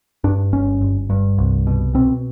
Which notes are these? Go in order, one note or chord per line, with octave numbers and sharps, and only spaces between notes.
G2 D4
G1 C#4
G1
G2
C2
B2
B2 C4